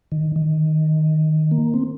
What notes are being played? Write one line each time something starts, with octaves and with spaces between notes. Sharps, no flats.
D#3
D#3
A#3
C4